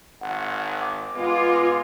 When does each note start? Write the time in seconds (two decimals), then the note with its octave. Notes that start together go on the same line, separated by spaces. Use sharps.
0.21 G#1 F#5
0.81 D6
1.15 G#3 B3 F4